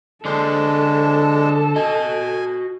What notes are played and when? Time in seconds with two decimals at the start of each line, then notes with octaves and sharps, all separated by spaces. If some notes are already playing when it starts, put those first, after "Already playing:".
0.25 D3 G#3 D4 A4 C5 A5
1.76 F#4 D#5 G#5